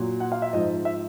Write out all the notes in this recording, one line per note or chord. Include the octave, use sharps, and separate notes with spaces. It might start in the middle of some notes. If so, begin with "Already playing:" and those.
Already playing: A#2 F#3
F#5
F5
E5
G#2 F3 D#5
E5